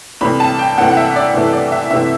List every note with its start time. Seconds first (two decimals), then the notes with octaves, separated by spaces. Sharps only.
0.21 C2 C3 E3 A3 B5
0.40 A5
0.59 G5
0.78 C2 C3 E3 A3 F#5
0.88 F#5
0.97 E5
1.16 D5
1.34 C2 C3 E3 A3
1.53 D5
1.72 E5
1.90 C2 C3 E3 A3 E5